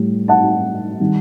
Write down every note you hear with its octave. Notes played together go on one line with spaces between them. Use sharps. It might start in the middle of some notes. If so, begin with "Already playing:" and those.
Already playing: A2 G3
F#5 A5
D#3 G3